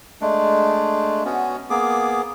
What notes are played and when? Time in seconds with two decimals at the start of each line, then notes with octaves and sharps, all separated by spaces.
0.21 G#3 A3 D4
1.25 B3 C#4 F#4
1.70 A#3 B3 G#4 D6